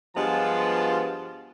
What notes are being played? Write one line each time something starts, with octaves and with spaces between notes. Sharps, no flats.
G2 F3 G#3 B3 F4 A5